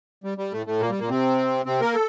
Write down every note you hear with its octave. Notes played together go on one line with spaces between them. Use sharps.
G3
G3
A2 A3
A2 A3
A#2 A#3
G3
A#2 A#3
C3 C4
C3 C4
A#3 A#4
A4